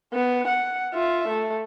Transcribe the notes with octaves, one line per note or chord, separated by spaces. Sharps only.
B3
F#5
F4 E5
A3